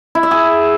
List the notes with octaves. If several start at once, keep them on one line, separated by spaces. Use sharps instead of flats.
E4
E5
G#4